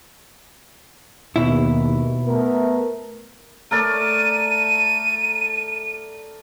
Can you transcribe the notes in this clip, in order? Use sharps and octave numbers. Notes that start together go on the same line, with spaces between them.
D#2 B2 E4
A3 B3 A#4
A3 A#4 D5 D#7